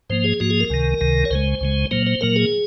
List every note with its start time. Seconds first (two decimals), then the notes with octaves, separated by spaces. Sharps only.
0.10 G#2 F3 A#3 C5
0.24 G#4
0.40 G#2 F3 A#3 F#4
0.50 G#4
0.60 A#4
0.70 C#2 C3 D#3
1.01 C#2 C3 D#3
1.25 C#5
1.31 C#2 C#3 G#3 C5
1.61 C#2 C#3 G#3
1.91 A#2 F#3 A#3 C5
2.06 C5
2.21 A#2 F#3 A#3 A#4
2.36 G#4